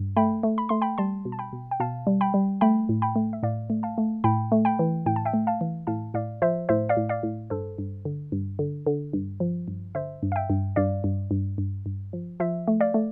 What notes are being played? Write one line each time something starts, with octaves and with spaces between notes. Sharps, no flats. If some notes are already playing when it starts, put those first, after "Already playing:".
Already playing: G2
A3 G5 B5
A3
B5
A3 C6
G5 B5
G3 A5 C6
B2
A5
G5 B5
B2
G5
B2 F5 A5
G3
G5 B5
G3
A3 G5 B5
A2
G5 B5
A3
E5
A2 D5 F5
A3
F5 A5
A3
A2 G5 B5
A3
G5 B5
E3
A2 G5
A5
E5 G5
A3
F5 A5
E3
A2 F5 A5
A2 D5 F5
F3 C5 E5
A2 C5 E5
D5 F5
A2
D5 F5
A2
G2 A4 C5
G2
D3
G2
D3
D3
G2
F3
G2
D3 C5 E5
G2
F5
E5 G5
G2
G2 D5 F5
G2
G2
G2
G2
F3
F3 C5 E5
A3
D5 F5
A3